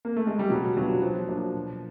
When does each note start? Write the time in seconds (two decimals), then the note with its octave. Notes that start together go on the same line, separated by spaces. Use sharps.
0.05 A#3
0.16 A3
0.27 G#3
0.39 G3
0.50 B2 F#3
0.76 F#3 G3 B3 D4 F4
1.02 F3 F#3
1.28 A#3 D4 F#4
1.54 B2